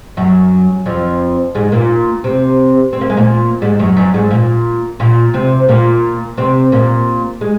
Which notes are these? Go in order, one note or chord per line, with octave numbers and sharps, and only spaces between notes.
F#2 F#3
F2 F3
G#2 G#3
A#2 A#3
C3 C4
C4
A#3
G#3
A#2 A#3
G#2 G#3
F#2 F#3
F#2 F#3
G#2 G#3
A#2 A#3
A#2 A#3
C3 C4
A#2 A#3
C3 C4
A#2 A#3
G#3